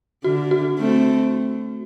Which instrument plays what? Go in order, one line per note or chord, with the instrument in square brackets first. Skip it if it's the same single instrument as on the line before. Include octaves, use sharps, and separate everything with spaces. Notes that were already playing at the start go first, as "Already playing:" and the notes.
[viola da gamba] D3 [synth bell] F#4
[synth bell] F#4
[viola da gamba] A3 C4